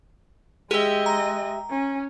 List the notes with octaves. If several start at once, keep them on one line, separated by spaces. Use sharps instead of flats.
G#3 G4 G#4 D#5 E5 G7
A#5
C#4